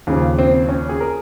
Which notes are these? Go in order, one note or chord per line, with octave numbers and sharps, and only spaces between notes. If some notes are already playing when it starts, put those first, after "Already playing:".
D#2 C#3 F3
C4
C#4
G#4
A#4